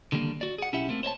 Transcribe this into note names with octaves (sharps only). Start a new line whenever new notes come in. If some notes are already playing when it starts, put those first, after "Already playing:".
D3 D#3 G3 A3 A#3
F#4 D5
G#4 F#5
B1 C#4 E4 G4 E5 F#5
A3 A#3 C4
C5 C#5 D#5 A5